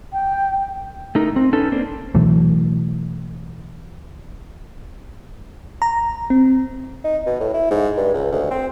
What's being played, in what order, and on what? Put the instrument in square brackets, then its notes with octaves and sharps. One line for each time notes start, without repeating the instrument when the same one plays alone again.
[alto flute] G5
[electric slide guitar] A3 D#4 A#4
C4
C#4 D#4 A4 B4
A#3 C4 D4
[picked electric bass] B2 E3 F#3 A3
[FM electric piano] A#5
C4
[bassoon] D#4
B2
A2
E4
G#2
G2
C#2
D2
C4